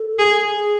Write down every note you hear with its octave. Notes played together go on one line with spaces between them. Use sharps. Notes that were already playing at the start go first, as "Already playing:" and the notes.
Already playing: A4
G#4
G#4